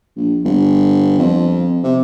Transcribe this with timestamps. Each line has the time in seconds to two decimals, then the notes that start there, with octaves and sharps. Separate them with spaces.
0.16 A#1
0.45 G1
1.18 F2
1.84 C3